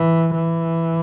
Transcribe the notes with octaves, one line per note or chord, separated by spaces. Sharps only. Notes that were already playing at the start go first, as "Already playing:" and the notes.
Already playing: E3
E3